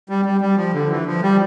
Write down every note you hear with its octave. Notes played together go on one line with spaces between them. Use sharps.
G3
G3
G3
F3
D3
E3
F3
G3